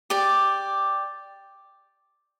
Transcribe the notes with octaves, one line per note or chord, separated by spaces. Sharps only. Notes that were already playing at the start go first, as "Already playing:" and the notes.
G4 D5